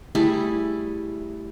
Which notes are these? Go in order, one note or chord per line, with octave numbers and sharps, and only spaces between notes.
G3 A3 E4 G#4